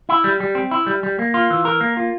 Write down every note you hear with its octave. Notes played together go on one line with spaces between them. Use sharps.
E4
G3
G3
C4
E4
G3
G3
A#3
F4
E3
A#4
A#3
F4